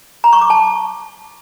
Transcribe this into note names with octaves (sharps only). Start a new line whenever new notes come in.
A#5
C#6
D6
A5